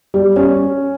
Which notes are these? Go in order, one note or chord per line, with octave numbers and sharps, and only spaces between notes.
G3
C#4